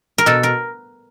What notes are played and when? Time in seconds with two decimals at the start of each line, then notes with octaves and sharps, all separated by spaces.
0.18 A#4
0.26 B2 A4
0.43 A#4